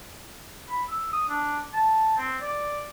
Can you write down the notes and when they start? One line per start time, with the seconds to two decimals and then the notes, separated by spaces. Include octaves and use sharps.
0.69 B5
0.88 E6
1.12 D#6
1.29 D4
1.74 A5
2.18 C4
2.41 D5